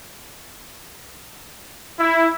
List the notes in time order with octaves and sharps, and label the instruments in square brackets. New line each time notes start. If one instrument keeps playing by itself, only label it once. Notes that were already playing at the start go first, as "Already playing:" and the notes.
[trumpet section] E4